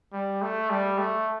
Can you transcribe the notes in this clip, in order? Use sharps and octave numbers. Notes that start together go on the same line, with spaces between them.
G3
A3
G3
A3